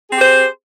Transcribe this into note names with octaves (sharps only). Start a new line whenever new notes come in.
C4 G4 G#4 C5